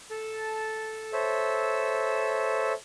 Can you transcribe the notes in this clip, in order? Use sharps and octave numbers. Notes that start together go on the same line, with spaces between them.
A4 A5
A4 C5 C#5 E5 E6